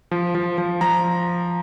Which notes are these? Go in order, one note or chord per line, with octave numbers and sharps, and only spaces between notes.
F3
F3
F3
F3 A#5